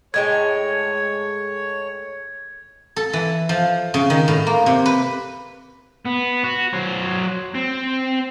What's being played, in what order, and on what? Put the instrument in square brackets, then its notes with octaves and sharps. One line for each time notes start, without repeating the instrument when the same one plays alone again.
[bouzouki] A2 G#3 G5 [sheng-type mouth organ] C#5 [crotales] G#6
[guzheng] A4
E3
F3
C#3
D#3
A2
A#3
C3
B4
[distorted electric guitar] B3
F#4
F#3 C5
C4